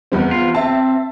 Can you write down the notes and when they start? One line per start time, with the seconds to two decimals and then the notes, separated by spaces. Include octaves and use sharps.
0.12 E2 G3 C4
0.31 F4
0.54 C4 E5 A5